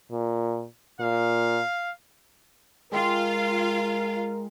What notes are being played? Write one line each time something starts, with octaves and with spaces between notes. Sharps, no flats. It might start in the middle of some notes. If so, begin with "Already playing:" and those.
A#2
A#2 F5
G#3 F4 A#4 F5 G5 C6